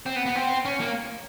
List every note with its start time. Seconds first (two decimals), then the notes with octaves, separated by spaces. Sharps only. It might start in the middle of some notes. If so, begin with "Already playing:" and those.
0.06 C4
0.16 B3
0.26 B3
0.35 C4
0.65 C#4
0.80 A#3